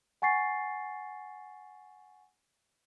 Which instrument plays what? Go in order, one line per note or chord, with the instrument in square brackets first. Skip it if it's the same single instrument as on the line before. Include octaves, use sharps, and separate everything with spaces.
[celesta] F#5 G#5 C#6 A6 C7